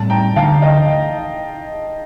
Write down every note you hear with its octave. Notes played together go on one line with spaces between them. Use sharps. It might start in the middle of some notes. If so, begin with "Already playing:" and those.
Already playing: A2 G3 C4 A5
G5 A#5
D2 D3 F3 A3 F5 A5
D#5 G5